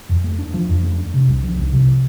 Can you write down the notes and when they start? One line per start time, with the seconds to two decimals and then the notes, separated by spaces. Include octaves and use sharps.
0.09 F2
0.24 A3
0.39 D4
0.54 F3
0.69 F2
0.83 A3
0.98 D4
1.14 C3
1.28 C2
1.43 F3
1.58 C2
1.73 C3